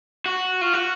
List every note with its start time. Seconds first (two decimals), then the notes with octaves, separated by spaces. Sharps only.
0.26 F#4
0.61 F4
0.74 F#4